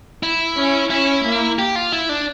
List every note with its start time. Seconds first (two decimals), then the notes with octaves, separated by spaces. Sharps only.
0.23 E4
0.56 C#4
0.90 C#4 E4
1.24 A#3
1.59 G4
1.76 F4
1.92 E4
2.09 D4